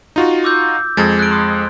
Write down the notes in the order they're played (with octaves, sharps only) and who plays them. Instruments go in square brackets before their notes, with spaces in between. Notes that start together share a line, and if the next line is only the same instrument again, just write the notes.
[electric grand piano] D#4 F4 F#4
[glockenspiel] D6 E6 G6
[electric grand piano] F2 G#3 [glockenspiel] G#6 A6
[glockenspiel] F#6 D7
C6 D#6